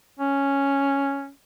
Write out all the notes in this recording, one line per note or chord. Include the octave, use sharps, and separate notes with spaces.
C#4